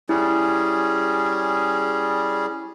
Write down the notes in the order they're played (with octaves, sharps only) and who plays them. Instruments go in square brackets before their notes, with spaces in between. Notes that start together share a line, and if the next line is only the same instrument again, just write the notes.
[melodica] G3 C#4 G#4 [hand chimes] E4